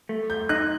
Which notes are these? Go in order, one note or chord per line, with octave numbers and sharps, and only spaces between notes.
A3
G6
D#4 F#6